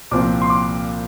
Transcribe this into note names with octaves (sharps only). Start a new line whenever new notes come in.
C2 A#2 F3 C4 D6
C6
D6